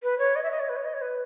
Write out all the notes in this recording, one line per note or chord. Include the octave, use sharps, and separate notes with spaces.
B4
C#5
D#5
E5
D#5
C#5
B4
C#5
D#5
C#5
B4